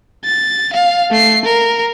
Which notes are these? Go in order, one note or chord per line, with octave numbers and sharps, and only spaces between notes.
A6
F5
A3 C7
A#4